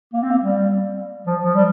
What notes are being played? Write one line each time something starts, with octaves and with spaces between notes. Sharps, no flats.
A#3
C4
A#3
G3
F3
F3
G3